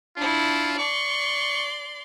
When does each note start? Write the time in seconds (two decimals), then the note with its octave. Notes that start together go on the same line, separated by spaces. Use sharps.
0.17 D4 E4 F4
0.79 D5 C6 C#6